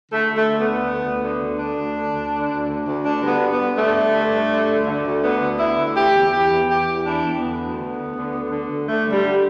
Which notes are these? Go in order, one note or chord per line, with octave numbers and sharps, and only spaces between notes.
D3 A3
D2
A3
D3
B3
D2
D3
D2
D3
D2
D3 D4
D2
D3
D2
D3
D2
D3
D2
D3 D4
G2
B3
D3
B3
G2
D3 A3
G2
D3
G2
D3
D2
D3
D2
D3 B3
D2
D3 E4
D2
E3 G4
E2
E3 G4
E2
E3 G4
E2
E3 D4
E2
D3 B3
D2
D3
D2
D3
D2
D3
D2
D3 A3
G2
G3
D3